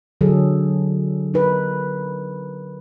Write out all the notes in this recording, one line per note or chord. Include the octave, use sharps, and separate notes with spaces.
D3 F#3 G#4 A4
D#4 A#4 B4